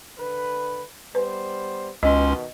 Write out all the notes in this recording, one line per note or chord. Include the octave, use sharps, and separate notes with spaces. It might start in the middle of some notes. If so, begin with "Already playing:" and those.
D3 B4
G3 B3 B4 C5
C#2 B2 D#3 C#4 D#5 C6